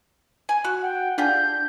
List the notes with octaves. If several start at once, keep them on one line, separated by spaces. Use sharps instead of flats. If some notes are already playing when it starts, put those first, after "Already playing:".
G#5
F#4
F#5 G5
D4 F4 G4 G#4 G6